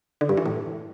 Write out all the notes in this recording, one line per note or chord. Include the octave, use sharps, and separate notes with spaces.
D3
G2
E3
A2